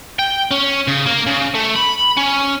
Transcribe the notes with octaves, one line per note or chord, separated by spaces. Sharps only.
G5
C#4
C#3
A#3
C#3
A3
B5
C#4